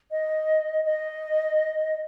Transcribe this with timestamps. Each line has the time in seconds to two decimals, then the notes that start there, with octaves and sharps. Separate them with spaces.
0.11 D#5
0.85 D#5